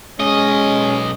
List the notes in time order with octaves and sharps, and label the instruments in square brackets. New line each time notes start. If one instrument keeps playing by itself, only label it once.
[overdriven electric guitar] B1 D#5 [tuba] G#3 [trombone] C#4